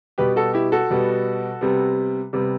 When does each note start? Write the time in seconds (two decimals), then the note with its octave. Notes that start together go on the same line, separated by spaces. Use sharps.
0.18 B2 G3 B3 G4 B4
0.36 F#4 A4
0.54 E4 G4
0.72 F#4 A4
0.91 B2 G3 B3
1.61 C3 G3 B3
2.33 C3 G3 B3